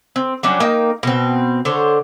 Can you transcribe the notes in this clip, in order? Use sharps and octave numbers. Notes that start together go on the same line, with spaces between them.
C4
F#3 G3 C#4 D4
A#3 D#4 G5
B2 C4
D3 C5 C#5